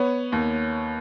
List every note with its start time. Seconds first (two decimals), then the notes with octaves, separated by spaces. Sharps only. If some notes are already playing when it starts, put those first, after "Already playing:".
Already playing: B3 C#5
0.32 D#2